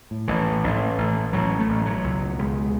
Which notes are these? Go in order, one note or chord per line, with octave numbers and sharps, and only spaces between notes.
A2
A1 E3
A2
A1
A2
A1
A2
A1 F#3
A2
A3
A1
B2 F#3
C#2
B2
C#2 G#3
B2